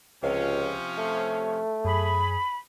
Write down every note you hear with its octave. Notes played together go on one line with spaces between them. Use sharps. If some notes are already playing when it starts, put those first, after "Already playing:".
C#2 C3 F3 C#4
A3
F#2 G#4 B5